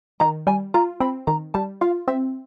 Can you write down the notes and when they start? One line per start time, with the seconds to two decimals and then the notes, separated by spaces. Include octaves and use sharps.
0.20 D#3 A#5
0.47 G3 G#5
0.74 F4 A#5
1.00 C4 B5
1.27 D#3 A#5
1.54 G3 A5
1.81 F4 F5
2.08 C4 E5